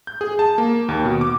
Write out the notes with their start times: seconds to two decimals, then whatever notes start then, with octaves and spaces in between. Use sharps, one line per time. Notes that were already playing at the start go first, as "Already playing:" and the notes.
0.07 G6
0.21 G#4
0.39 A5
0.58 A#3
0.89 D#2
1.05 B2
1.21 D6